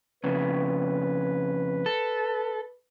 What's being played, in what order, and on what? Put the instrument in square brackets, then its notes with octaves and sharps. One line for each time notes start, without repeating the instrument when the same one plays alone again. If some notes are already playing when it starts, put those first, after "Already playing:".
[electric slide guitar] F2 C#3 [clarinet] B4
[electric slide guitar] A4